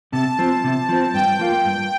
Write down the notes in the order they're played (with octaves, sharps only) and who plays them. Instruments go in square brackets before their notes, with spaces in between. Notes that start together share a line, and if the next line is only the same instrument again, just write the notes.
[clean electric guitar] C3 [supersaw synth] A5
[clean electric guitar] F3 C4
C3
F3 C4
[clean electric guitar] G2 [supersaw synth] G5
[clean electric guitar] F3 A#3 F4
G2